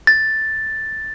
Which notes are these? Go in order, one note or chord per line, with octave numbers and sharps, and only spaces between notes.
A6